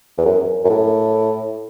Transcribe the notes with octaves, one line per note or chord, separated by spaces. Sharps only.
E2
F#2
F#2
A2